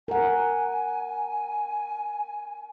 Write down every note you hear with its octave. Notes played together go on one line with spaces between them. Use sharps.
A#4 F#5 G#5